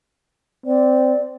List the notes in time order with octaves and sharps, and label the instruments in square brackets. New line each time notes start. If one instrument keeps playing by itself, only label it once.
[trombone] C4 [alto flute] D5